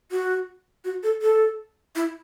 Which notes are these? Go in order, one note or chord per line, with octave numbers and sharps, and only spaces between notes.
F#4
F#4
A4
A4
E4